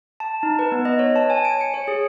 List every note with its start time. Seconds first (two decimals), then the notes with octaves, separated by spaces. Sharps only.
0.20 A5
0.43 D#4
0.59 B4
0.72 B3
0.85 D#5
0.99 C#5
1.16 A5
1.30 G#5
1.45 D7
1.61 C#7
1.74 C#5
1.88 G#4